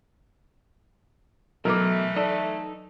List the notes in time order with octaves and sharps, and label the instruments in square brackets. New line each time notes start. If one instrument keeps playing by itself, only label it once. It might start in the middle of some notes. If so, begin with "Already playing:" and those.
[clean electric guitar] B2 [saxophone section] E3 A3 [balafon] F#3 D6 [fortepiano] A#4
[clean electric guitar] D#4 A4 [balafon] D5